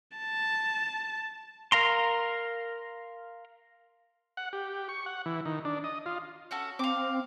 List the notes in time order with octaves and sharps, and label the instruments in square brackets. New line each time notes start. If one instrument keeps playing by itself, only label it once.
[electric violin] A5
[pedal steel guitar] A#4 F5 A#5 C6
[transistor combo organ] F#5
G4
C#6
F#5
E3
D#3
D4
D#5
F4
[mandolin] C#4 F#4 A4
[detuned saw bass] C4 [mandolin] F5 D6